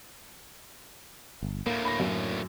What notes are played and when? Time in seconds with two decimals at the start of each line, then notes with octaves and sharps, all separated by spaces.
1.43 G1
1.66 D2 A2 A#3
1.85 B5 A#6
2.00 F#2